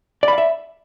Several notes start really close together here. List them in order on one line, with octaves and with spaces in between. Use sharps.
D5 B5 F5 E5